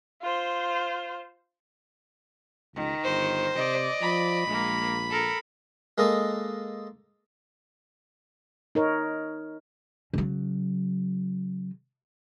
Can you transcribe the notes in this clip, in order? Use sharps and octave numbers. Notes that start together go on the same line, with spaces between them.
F4 C5
C#2 D#3
G1 C5
C3 D5 D#5
F3 B5
A#1 G#3 A#3
A4 A#4
G#3 A#3 A4 A#4 D#5
D#4 A#4 C#5
C#3 F#3